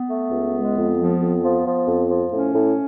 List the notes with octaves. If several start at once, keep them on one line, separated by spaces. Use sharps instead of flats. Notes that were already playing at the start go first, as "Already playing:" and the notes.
Already playing: B3
A3
C#2
G#3
F2
F3
F2
F3
F3
F2
F3
A2 C#4
A2